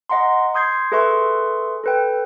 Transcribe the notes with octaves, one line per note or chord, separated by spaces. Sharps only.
D#5 F#5 A#5 C6
C6 D#6 G6 G#6 C7
G#4 A4 B4 E5 C6 C#6
A4 B4 G5